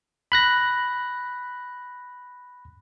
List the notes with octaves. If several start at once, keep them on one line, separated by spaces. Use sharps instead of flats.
B5 F#6 A#6